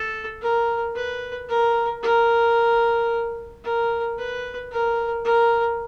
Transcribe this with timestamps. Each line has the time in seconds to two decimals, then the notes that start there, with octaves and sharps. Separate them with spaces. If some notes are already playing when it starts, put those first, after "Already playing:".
Already playing: A4
0.42 A#4
0.95 B4
1.49 A#4
2.03 A#4
3.64 A#4
4.18 B4
4.71 A#4
5.24 A#4